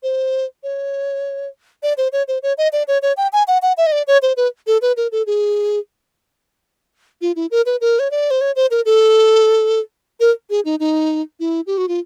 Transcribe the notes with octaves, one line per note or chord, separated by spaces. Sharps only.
C5
C#5
D5
C5
C#5
C5
C#5
D#5
D5
C#5
C#5
G5
G#5
F#5
F#5
E5
D#5
D5
C#5
C5
B4
A4
B4
A#4
A4
G#4
F4
E4
A#4
B4
A#4
C#5
D5
C5
C#5
C5
A#4
A4
A#4
G#4
D#4
D#4
E4
G4
F#4
F4